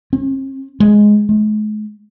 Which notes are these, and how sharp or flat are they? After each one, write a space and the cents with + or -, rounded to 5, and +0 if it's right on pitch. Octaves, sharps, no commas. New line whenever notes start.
C4 +45
G#3 +5
G#3 +45